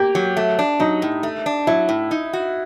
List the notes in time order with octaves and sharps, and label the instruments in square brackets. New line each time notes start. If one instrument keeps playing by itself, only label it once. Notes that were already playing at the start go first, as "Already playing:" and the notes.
Already playing: [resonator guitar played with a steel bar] A#3 [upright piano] G4
[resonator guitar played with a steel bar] F#3
A3
D4
[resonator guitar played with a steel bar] F#3 [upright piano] D#4
[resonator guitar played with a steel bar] A2
A3
D4
[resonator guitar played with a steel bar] F#3 [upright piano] E4
[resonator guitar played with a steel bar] A2
D#4
F#4